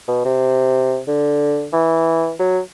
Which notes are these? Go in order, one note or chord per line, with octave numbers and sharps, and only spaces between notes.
B2
C3
D3
E3
F#3